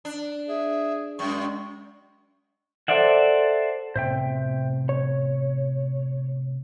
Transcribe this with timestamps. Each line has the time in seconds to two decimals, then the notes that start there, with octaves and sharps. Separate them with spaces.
0.05 D4
0.48 G#4 E5
1.19 F#2 G#3 C#6
2.88 A4 C5 D5 E5 F#5
3.96 A2 C3 B3 C5 E5 G5
4.89 C#5